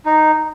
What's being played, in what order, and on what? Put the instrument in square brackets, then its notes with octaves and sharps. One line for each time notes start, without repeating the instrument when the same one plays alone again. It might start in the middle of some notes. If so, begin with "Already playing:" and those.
[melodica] D#4